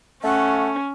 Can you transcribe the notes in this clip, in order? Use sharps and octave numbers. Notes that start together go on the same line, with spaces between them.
A3 C#4 F#5